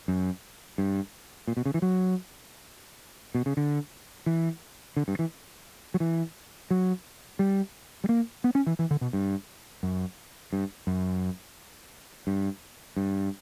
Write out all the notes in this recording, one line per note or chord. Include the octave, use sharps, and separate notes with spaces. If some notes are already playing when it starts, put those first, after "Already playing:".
F#2
G2
A#2
B2
C#3
E3
F#3
B2
C#3
D3
E3
D3
G2
E3
F#3
E3
F#3
G3
G3
A#3
B3
C#4
E3
E3
D3
B2
G2
F#2
G2
F#2
G2
G2